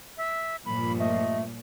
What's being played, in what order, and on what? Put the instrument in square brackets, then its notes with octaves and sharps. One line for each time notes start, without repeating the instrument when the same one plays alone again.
[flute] E5
[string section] G2 A#2 F3 [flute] B5
[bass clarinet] A3 [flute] D#5